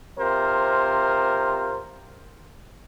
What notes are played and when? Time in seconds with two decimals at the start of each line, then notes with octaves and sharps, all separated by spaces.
0.19 C3 F4 A#4 C5